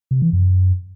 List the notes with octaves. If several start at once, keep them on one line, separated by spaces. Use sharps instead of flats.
C3
E3
F#2